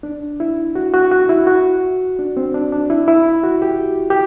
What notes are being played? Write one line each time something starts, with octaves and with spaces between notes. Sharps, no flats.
D4
E4
F#4
F#4
F#4
E4
F#4
D4
C4
D4
D4
E4
E4
F#4
G4
G4